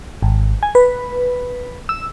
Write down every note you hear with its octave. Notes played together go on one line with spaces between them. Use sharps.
G#1
G#5
B4
E6